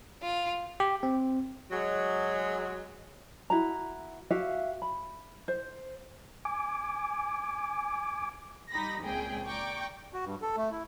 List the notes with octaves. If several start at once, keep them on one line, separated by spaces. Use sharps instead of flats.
F4
G4
C4
F#3 G#3
E4 F#4 A#5
F#4 G4 E5 F5
B5
C5
G#5 D6
G3 D#4 G4 B5 A#6
C#2 A#2 C4 G#4 G5
D5 G5 A#5 C#6 D6
F#4
G2
A4
A3
E4